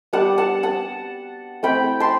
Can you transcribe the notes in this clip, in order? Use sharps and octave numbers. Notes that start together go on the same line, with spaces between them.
G3 B3 D4 F#5 A5
F#5 A5
F#5 A5
A3 C4 E4 G5 B5
A5 C6